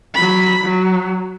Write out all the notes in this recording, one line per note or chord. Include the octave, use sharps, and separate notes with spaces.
F#3 B5
F#3